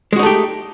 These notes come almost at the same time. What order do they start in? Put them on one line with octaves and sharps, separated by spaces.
G#3 F#4 D#4 A3 G4